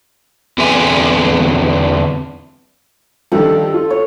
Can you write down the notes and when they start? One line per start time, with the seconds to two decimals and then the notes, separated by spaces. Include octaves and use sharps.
0.58 E2 D3 E3 C4 E5 G#5
3.32 G2 D#3 F3 A4
3.74 F4
3.90 C#5